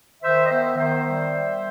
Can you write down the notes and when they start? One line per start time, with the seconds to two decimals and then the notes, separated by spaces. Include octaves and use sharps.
0.23 D#3 C5 E5
0.45 D#5
0.50 B3 C5 E5
0.77 D#3 C5 E5
1.03 G3